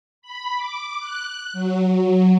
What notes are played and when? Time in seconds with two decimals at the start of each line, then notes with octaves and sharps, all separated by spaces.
0.22 B5
0.56 D6
0.99 F#6
1.53 F#3